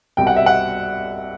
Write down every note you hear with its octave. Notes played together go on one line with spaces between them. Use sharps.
C2 B2 G3 G5
F#5
E5
F#5